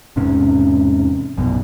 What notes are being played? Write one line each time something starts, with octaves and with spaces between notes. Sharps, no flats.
E1 G#2 C3 C#4
A#1 F#2 B2